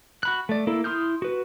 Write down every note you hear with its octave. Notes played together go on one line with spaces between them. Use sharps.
F#4 B5 F#6
A3 D5
A#3 E4 A4
E4 C6 D#6 F6 G6
F#4 B4